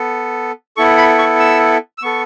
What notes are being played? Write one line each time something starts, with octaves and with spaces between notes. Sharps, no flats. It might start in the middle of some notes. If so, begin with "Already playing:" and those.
Already playing: B3 A4
B3 E4 A4 C#6
B5
C#6
E6
E6
B3 A4 C#6